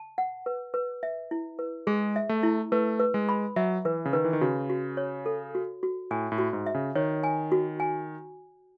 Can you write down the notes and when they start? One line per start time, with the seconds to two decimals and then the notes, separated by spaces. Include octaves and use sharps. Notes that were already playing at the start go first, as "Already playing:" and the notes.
Already playing: A5
0.18 F#5
0.46 B4
0.74 B4
1.03 E5
1.31 E4
1.59 B4
1.87 G#3 G#4
2.16 E5
2.29 A3
2.43 E4
2.72 A3 B4
3.00 B4
3.14 G#3
3.29 B5
3.56 F#3 E5
3.85 E3 B4
4.05 C#3
4.13 D#3 B4
4.24 E3
4.33 D#3
4.41 C#3 F#4
4.70 F#4
4.97 C#5
5.26 A4
5.55 F#4
5.83 F#4
6.11 A2 G#5
6.32 A2
6.38 F#4
6.53 G#2
6.66 E5
6.74 C#3
6.95 D#3 C#5
7.24 G#5
7.52 F#4
7.80 G#5